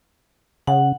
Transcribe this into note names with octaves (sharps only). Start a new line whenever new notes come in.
C#3 F#5